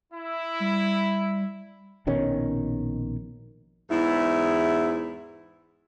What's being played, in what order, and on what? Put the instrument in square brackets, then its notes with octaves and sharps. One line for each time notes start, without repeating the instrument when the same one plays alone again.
[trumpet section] E4
[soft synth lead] G3
[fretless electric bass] A#1 B2 D#3 C#4
[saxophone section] E2 G#2 E4